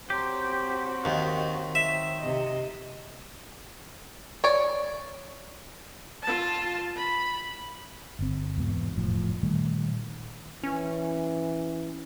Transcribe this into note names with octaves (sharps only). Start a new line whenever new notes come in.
C4 F#4 G4 C#5 A#5 C6
D#2 D#3
E5
C3 D#5
C#5 D5
F4 A5
B5
G1 C4
E2 G#2 B2
F1 A2 F3
A#2 D#3 G3 A3
E3 C#4